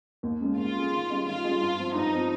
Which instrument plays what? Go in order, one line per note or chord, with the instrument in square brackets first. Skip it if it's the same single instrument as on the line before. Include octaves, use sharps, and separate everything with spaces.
[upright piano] D#2
C#3 G#3 C#4 G#4
[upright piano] D#2 [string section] F4
[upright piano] C#3 G#3 C#4 G#4
D#3
G3 C#4 G#4 D#5
[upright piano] D#3 [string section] F4
[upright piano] G3 C#4 G#4 D#5
G2
F3 C4
[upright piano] G2 [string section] D#4
[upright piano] F3 C4